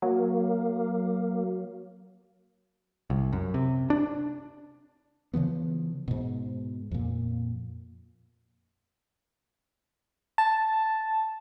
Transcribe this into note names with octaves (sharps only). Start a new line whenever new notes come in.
F#3 A#3
C2
F#2
C3
D4
C#3 E3 F3 B3
G#2 B2
F2 A#2
A5